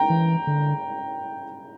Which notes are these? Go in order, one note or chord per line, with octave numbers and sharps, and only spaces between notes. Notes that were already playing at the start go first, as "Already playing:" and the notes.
Already playing: G5 A#5
E3
D3